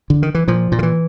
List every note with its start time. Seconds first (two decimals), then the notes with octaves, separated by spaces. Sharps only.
0.10 D3
0.23 D#3
0.35 E3
0.48 A#2 F3
0.72 A#2
0.79 D#3
0.83 E3